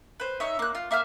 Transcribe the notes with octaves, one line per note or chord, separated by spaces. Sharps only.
B4 C5
D#4 C#5 E5
A#3 F#6
F4
A#3 E5 F5 F6